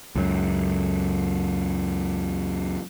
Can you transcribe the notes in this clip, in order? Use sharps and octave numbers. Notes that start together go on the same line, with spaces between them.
C#2 F#2